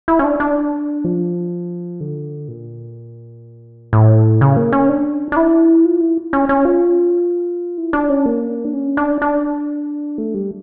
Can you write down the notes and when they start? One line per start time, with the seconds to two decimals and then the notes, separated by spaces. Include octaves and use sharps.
0.08 E4
0.19 C#4
0.24 D4
0.40 D4
1.04 F3
2.00 D3
2.48 A#2
3.93 A2
4.41 C#3
4.57 A#3
4.72 C#4
4.89 D4
5.32 D4
5.37 E4
5.85 F4
6.01 E4
6.33 C#4
6.49 C#4
6.65 F4
7.78 E4
7.93 D4
8.10 C#4
8.26 A#3
8.65 D4
8.73 C#4
8.97 D4
9.22 D4
10.18 A3
10.34 G3